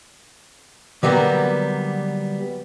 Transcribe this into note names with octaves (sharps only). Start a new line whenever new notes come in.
D3 F#3 G3 A#3 B3